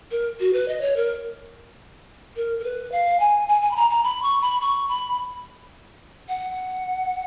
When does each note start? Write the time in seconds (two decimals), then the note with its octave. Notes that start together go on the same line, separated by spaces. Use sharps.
0.11 A#4
0.40 F#4
0.53 B4
0.68 D#5
0.81 C#5
0.96 A#4
2.36 A#4
2.59 A#4
2.64 B4
2.92 F5
3.20 G#5
3.48 G#5
3.62 G#5
3.71 B5
3.76 A#5
3.90 A#5
4.03 B5
4.22 C#6
4.41 B5
4.61 C#6
4.88 B5
6.28 F#5